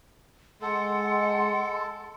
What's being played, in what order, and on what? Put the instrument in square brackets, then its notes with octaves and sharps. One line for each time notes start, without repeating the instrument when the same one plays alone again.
[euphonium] G#3 [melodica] A4 [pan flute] F#5 [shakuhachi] C6